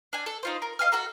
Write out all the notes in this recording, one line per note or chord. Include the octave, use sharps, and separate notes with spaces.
D4 G#5
A4
D#4 F4 C5
A#4
D#5 F5 G#5 F6
F#4 A4 A#5